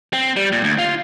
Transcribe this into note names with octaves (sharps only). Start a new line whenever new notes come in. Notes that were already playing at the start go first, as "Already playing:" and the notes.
C4
G3
A#2
D2
F4